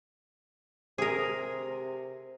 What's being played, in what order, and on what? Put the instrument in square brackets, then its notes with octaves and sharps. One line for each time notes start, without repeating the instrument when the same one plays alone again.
[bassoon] C3 [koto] G#4 A#4